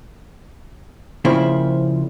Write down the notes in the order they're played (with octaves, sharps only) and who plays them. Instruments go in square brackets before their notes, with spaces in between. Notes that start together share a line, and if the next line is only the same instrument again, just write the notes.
[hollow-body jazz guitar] A#2 C#3 F3 C4 E4